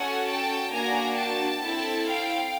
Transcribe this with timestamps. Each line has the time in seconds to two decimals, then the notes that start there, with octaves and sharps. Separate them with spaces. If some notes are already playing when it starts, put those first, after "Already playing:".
Already playing: C#4 F#4 A4 F#5 G#5
0.28 G5 A5
0.72 A#3 D4 F#4 G#5 A#5
1.17 G5 A5
1.62 C4 E4 A4
2.06 F5 G5